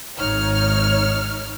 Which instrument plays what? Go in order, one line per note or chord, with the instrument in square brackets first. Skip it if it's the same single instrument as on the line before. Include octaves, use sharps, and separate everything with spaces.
[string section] G#1 D#4 C#5 F6